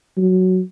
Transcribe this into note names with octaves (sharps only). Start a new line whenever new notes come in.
F#3